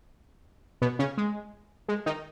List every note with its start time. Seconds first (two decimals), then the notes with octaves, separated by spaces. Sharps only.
0.82 B2 B3
0.99 C#3 C#4
1.17 G#3
1.88 G#3
2.06 D#3 D#4